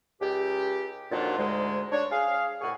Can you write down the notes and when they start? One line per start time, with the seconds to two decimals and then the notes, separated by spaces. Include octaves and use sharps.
0.21 C#2 G4
1.11 F2 A#2 D#3 F#3 D4 F4
1.37 D2 G#2 G#3
1.92 D4 C#5
2.11 G#4 F5
2.61 C2 A2 G#4 F#5 G#5 C#6